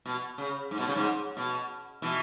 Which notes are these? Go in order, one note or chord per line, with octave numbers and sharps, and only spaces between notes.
B2
C#3
G#2
B2
C#3
G#2
B2
B2 E3